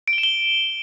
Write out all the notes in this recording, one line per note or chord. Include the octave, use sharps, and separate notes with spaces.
D7
G7
E7
G7